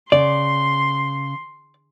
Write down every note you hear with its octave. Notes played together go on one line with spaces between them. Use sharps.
C#3 D5 C6